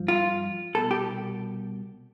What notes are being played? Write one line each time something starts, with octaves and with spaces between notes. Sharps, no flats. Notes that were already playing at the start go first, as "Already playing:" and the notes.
Already playing: G2 F3
F4
C2 B2 A4
G4